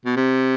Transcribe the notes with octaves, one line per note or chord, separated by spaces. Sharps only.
B2
C3